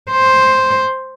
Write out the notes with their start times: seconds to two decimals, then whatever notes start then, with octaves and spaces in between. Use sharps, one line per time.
0.11 C5